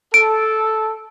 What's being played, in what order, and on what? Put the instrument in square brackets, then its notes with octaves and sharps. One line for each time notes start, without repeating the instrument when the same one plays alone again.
[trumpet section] A4 [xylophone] D7